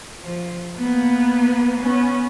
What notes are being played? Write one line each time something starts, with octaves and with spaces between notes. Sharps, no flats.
F3
A#3 B3
B3 C#4